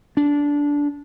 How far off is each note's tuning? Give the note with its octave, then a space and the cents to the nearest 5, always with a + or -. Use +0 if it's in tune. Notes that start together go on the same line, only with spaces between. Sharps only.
D4 -15